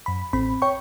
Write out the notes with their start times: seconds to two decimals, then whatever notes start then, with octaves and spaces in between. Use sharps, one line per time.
0.06 F#2 B5
0.33 A1 C4 B5
0.62 C#5 G5 C#6